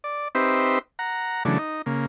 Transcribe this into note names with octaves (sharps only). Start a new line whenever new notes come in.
D5
C4 D#4 G4 B4 C5 E5
F#5 A#5
C#3 E3 F#3 A3 D4
D#4
C#3 A#3